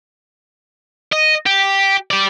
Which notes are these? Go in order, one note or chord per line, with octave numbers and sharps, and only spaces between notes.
D#5
G4
G4 D5